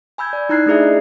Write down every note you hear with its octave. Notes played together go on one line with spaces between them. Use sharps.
G#5 B5 E6 G6 G#6
D5
D#4 E4 A#5 F#6 G#6 C7
A3 D4 E4 G#4 D5 E5
D#5